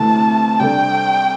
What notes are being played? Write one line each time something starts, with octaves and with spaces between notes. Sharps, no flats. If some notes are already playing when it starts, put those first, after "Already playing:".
Already playing: D2 C3 E3 A3 A5
C3 G3 D4 A4 G5